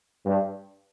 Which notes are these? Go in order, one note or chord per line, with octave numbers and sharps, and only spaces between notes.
G2